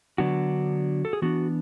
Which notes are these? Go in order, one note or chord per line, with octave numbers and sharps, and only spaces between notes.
D3 F#3 B3 D4 F#4
A4
G#4
E3 B3 D4 F#4